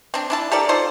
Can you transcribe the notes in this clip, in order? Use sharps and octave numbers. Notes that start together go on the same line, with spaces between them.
C4 D4
D4 E4 A5
G4 A4 A#4 D5
D#4 F4 A4 C5